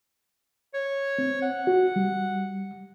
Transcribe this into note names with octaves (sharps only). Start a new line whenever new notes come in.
C#5
C4
F#5
F#4
G3